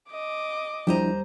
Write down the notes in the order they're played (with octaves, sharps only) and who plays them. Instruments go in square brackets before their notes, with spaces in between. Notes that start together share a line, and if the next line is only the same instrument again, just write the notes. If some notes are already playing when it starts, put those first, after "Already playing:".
[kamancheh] D#5 D6
[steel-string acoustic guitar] D#2 C5 A#5 [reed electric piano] F3 D4 E4 [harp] G3 D#7